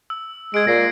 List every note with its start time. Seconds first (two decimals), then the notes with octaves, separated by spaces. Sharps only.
0.10 E6
0.54 G#3 G#6 D7
0.67 A#2 A#6 C7